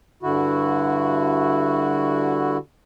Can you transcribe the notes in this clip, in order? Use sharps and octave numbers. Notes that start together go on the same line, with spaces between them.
G2 D3 E4 F#4